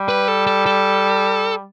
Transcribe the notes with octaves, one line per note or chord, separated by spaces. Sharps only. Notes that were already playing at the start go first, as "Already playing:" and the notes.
Already playing: G3
B4
A4
A4
A4